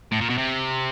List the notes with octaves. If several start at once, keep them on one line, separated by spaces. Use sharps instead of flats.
A2
A#2
B2
C3